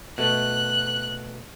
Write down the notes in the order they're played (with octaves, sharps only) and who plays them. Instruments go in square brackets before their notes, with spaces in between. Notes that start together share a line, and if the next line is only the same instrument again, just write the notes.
[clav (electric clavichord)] B2 A3 [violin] F#6